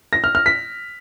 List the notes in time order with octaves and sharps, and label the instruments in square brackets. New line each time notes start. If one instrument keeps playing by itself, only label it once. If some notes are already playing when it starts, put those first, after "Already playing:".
[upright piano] A#6
F6
F6
B6